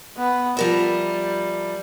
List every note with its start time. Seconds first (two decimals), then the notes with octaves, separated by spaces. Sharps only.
0.17 B3
0.57 F3 G3 A#4 E5